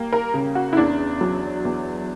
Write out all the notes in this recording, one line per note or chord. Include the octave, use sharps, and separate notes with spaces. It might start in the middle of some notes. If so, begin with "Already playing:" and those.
Already playing: G3 A#3
A#4
C#3
F#4
E4
E2 D4
F#3
E2